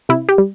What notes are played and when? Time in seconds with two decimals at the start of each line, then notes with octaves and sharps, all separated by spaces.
0.09 C3 E4
0.29 G4
0.38 G3